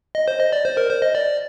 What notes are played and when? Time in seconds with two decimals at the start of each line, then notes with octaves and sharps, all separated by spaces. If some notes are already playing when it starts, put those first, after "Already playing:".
0.15 D#5
0.28 C5
0.40 D#5
0.53 D5
0.65 C5
0.77 A#4
0.90 C5
1.02 D#5
1.15 D5